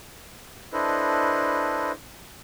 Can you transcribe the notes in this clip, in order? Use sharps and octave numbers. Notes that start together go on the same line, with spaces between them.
D4 E4 A4 B4 C5 D#5